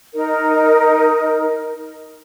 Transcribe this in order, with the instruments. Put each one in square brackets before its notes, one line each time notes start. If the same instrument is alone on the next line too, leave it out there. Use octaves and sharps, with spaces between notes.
[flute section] D#4 A#4